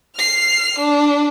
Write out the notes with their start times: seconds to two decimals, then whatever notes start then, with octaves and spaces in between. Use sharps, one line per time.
0.16 F6 C7
0.79 D4